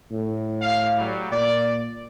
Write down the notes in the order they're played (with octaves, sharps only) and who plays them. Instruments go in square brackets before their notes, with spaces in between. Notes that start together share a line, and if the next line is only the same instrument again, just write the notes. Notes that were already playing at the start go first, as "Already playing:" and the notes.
[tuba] A2
[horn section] F5
F#3 G3
[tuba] A#2 [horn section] D5